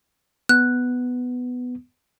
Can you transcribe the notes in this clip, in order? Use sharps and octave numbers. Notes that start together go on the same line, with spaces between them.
B3 F#6